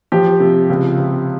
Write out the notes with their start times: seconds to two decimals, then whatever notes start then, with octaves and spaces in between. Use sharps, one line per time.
0.12 F3 G4
0.40 C3
0.70 C#2
0.98 C3